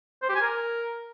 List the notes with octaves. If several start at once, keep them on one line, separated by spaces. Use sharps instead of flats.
C5
G4
G#5
A#4